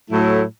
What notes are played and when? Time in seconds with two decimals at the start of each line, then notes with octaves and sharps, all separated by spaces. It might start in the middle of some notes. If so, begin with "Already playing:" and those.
0.10 A2 F#3 A3 E4